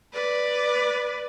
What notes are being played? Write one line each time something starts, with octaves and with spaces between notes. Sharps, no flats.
B4 D5